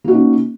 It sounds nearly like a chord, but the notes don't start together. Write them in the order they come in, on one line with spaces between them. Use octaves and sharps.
A#3 F#4 D#4 C#4